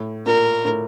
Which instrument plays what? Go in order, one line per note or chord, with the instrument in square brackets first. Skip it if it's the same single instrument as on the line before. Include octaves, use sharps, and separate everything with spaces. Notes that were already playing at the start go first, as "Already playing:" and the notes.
Already playing: [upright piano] A2
[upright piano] A#2 [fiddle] A#4
[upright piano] A2